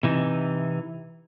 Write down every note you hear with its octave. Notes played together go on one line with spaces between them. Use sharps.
C3 E3 D#4